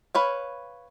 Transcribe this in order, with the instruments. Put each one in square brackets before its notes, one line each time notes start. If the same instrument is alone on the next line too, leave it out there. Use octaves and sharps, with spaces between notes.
[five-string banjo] B4 C#5 F5